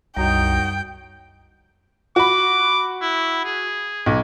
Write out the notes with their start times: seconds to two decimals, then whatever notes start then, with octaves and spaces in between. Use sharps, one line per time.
0.17 C2 F#2 D#3 F#3 G3 D#4 G5
2.16 F#4 B5 D6
3.02 E4
3.45 G#4
4.06 B1